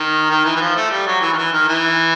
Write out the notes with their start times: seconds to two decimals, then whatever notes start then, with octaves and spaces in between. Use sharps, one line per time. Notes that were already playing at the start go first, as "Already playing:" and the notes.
Already playing: D#3
0.30 D#3
0.45 E3
0.56 E3
0.61 F3
0.76 A3
0.91 G3
1.07 F#3
1.21 E3
1.32 D#3
1.37 E3
1.52 D#3
1.68 E3